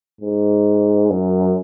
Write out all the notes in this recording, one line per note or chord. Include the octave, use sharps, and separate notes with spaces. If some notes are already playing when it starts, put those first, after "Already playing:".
G#2
F#2